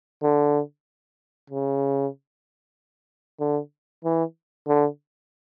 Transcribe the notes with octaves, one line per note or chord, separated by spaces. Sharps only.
D3
C#3
D3
E3
D3